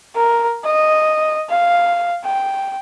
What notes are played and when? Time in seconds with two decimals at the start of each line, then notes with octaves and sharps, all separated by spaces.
0.15 A#4
0.64 D#5
1.50 F5
2.24 G5